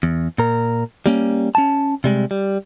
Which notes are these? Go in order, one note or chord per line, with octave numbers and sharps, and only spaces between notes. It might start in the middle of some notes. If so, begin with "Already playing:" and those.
E2
A#2 A#4
G3 A#3 C#4
C#4 A5
C3 G3 G#3
G3